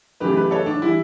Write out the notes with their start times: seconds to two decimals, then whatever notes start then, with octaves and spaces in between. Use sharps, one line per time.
0.20 F#2 C#3 E3 A3 G4 B4
0.37 G4 B4
0.51 A4 C#5
0.66 D4
0.82 E3 G3 E4